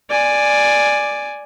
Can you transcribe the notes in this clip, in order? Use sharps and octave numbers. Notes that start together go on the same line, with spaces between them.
D5 G#5